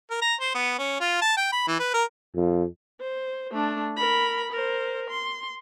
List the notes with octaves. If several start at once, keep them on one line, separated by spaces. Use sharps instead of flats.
A#4
A#5
C5
B3
C#4
F4
A5
G5
B5
E3
B4
A#4
F2
C5
A3 D4
A#4 B5
A#4 C5
C6